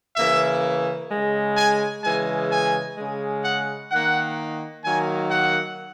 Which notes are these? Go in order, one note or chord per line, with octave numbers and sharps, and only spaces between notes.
C#3 E3 A#3 E5
C#3 G#3
G#5
C#3 E3 G#3 G#5
G#5
C#3 G#3
F#5
D#3 A#3 F#5
D#3 F#3 A#3 G#5
F#5